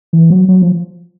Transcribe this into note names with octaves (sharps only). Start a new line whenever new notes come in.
E3
F#3
F#3
F3